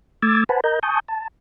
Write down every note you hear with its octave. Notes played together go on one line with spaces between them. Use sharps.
A3 D6 E6 G#6 A6
B4 C5 F#5 G#5 A5 B5
A#4 D#5 A#5 G6
G#5 A5 C#6 D#6 G6
A5